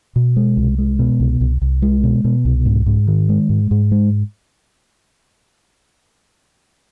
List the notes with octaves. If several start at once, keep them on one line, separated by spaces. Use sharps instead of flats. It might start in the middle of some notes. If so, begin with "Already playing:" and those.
B2
G#3
C2
G#3
B2
C2
C2
C2
G#3
B2
B2
C2
G#2
G#2
D#3
G#3
G#2
G#2
G#3